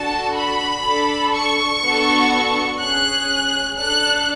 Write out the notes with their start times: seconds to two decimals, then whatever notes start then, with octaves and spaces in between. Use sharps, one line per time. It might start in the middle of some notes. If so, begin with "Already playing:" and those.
Already playing: D4 F#4 A4 A5
0.36 B5
0.85 D4 A4
1.34 C#6
1.83 B3 D4 F#4 A4
2.81 C#4 G#4 F#6
3.80 D4 A4 F#6